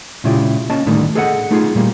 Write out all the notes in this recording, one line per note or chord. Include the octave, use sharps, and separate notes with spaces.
A#2 C#3 G#3 E4 F4 G4
A#3 C#4 D#5 A5
A2 D3 D#3 G3 A3
G#4 A4 D#5 F5 F#5
A3 D#4 F4 G#4
A#2 G3 A#3